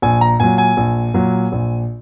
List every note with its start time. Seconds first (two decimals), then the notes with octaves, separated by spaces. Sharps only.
0.02 A#1 G#5
0.21 A#5
0.40 A#2 F#3 G#5
0.58 G#5
0.77 A#1
1.14 A#2 F#3
1.52 A#1